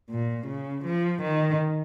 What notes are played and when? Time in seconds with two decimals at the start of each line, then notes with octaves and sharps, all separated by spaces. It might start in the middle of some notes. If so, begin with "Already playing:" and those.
0.10 A#2
0.47 C#3
0.85 F3
1.22 D#3